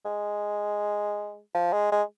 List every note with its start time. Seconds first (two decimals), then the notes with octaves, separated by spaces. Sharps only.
0.05 G#3
1.55 F3
1.73 G#3
1.92 G#3